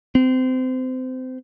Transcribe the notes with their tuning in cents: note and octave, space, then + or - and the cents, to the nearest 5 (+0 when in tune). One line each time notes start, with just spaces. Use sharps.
C4 -25